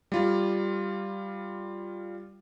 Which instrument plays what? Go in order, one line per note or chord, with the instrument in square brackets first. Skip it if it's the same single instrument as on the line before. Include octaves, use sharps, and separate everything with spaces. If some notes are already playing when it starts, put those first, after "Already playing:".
[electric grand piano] G3 F4